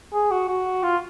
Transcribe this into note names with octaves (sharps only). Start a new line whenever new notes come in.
G#4
F#4
F#4
F4